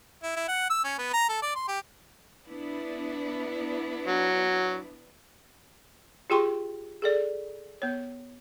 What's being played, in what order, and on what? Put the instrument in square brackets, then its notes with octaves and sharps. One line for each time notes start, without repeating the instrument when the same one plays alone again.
[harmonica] E4
E4
F#5
E6
C#4
B3
A#5
A4
D5
C6
G4
[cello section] B3 D4 E4
[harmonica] F#3
[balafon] F4 G4 G#4 G5 C6 C#6
G#4 A4 D5
B3 C#5